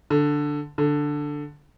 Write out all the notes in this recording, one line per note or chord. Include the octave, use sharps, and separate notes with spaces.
D3
D3